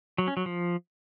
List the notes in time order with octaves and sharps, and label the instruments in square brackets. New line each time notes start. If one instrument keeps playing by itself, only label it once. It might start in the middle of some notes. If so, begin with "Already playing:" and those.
[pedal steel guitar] F#3
C#4
F#3
F3